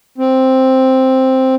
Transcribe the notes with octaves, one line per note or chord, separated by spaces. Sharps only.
C4